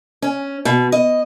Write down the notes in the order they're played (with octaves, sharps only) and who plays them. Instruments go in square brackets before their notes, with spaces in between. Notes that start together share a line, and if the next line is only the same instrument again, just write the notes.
[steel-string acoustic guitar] C#4
B2
D#5